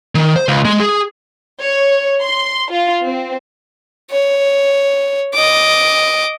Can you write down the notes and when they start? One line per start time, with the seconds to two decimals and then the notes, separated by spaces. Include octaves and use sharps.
0.15 D#3
0.36 C5
0.48 C#2
0.65 G#3
0.80 G#4
1.61 C#5
2.22 C6
2.71 F4
3.04 C4
4.11 C#5
5.34 D#5 D6